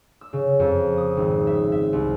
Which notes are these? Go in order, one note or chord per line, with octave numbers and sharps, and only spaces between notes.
E6
C#3
F2
D#6
G#1
E5
E5
C2